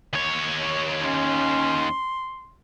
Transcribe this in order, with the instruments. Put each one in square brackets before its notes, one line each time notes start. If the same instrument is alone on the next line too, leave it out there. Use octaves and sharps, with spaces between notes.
[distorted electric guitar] D#2 C#5
[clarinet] C#4 [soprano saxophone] C6